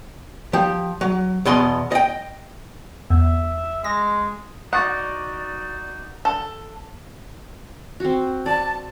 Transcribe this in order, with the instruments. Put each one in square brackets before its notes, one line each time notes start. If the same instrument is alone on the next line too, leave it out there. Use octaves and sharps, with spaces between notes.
[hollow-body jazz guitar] F3 G4
F#3
E2 B2 D#5 C6
D#5 G5
[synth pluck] E2 [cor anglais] E5
[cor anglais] G#3 [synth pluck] A#6
[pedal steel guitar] D#4 F#4 D5 [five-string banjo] F#5
[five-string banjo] A4
[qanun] C4 F#4
[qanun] D5 [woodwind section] A5